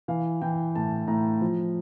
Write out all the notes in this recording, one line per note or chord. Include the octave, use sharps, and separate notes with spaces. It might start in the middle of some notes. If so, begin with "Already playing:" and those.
E3 F5
E3 G5
A2 A5
A2 A#5
F3